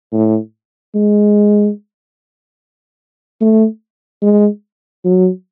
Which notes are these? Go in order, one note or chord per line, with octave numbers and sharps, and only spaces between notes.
A2
G#3
A3
G#3
F#3